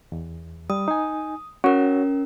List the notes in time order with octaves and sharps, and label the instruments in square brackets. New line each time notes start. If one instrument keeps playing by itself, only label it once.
[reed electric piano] E2
[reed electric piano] G3 [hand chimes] D#6
[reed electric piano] D#4 G#5
[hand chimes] C#4 A#4 [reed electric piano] F#4 C#5